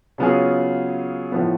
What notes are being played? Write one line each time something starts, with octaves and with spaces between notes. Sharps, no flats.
C#3 F#3 B3 F4 G#4
A2 F3 B3